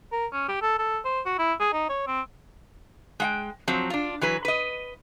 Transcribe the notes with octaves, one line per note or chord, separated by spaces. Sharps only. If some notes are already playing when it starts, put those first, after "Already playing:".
A#4
C#4
G4
A4
A4
C5
F#4
E4
G#4
D#4
C#5
C4
G#3 F#5 G5
F3 F#3 C4
D4 F4
E3 F#3 B4
B4 D#5